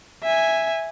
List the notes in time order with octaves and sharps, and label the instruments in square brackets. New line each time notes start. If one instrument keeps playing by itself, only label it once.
[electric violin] E5 G#5